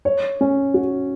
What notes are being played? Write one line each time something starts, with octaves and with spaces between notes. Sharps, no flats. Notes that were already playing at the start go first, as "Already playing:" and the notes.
C#5
C#4
F#4